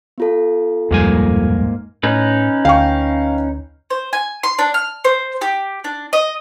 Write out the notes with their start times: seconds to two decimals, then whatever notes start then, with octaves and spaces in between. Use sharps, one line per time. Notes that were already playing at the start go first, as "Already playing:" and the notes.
0.18 B3 F4 A4
0.91 D1 F2 G#2 G3 A#3 G#5
2.03 A2 C#4 D#4 B4
2.65 D2 F5 G5 C#6
3.90 C5
4.13 G#5
4.43 C6
4.59 D4
4.74 F6
5.05 C5
5.41 G4
5.84 D4
6.13 D#5